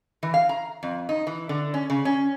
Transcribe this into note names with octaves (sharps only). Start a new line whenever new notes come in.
E3
F5
A#5
F2
D#4
E3
D3
C#4
C#3
C#4